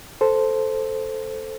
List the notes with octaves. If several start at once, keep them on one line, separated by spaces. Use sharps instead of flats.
A4 C5